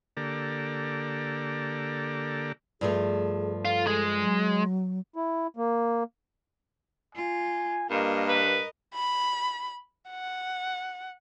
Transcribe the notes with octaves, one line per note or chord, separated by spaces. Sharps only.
D3 A#3 G4 A4 D5 A#5
G2 F3 A3 G#4
F4 A4
G#3
F#3
E4
A#3
F4 G#5
G2 A#3 A#4 D#5
B4
B5
F#5